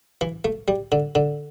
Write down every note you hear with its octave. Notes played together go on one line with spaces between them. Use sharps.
E3
A3
G3
D3
D3